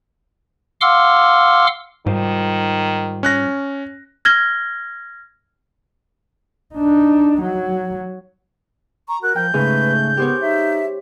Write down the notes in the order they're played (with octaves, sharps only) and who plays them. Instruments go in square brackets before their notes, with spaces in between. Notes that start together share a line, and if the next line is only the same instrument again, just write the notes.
[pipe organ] F5 F#5 C6 D6 E6 F6
[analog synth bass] G#2 [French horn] D#3 [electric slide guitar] G3 F4 C5
[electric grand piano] C#4 F#6 A#6
[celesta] F6 G#6 A#6 G7
[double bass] D4 D#4
F#3
[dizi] A#5 [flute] C#6
[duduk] F#4 [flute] A#4 [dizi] F#6
[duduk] F3 [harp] G5 [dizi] G6
[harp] G#2 C#3 [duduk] A3 [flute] B4
[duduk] B3 [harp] G4 C5 C#5 [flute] A#4
[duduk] D#4 [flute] E5